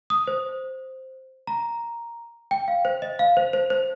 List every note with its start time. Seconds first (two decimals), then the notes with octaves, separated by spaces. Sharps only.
0.10 D#6
0.27 C5
1.47 A#5
2.51 G5
2.68 F5
2.85 C5
3.02 D#5
3.19 F5
3.37 C5
3.53 C5
3.70 C5